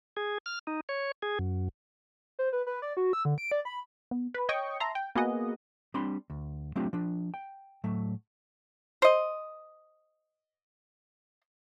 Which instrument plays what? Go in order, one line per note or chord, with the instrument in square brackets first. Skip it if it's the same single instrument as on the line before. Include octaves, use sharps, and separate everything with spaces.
[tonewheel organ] G#4
F6
D#4
C#5
G#4
F#2
[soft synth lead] C5
B4
B4
D5
F#4
E6
D3
D7
D5
B5
[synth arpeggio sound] B3
B4 B5
C#5 D#5 G5 C#6 D#6
E5 A5 A#5 C6
G5
A#3 B3 F#4 G#4 D#5 F#5
[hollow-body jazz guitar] G3 C4 D4 B5 C6
D2
F#3 A3 C4 D4 F4 G4
F3 D4
G5
A2 F#3 A3
[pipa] C5 D#5